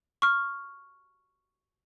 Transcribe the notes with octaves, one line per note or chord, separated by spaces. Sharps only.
C#6 F6